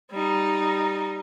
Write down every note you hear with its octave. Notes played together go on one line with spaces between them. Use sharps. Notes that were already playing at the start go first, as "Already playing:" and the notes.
G3 D#4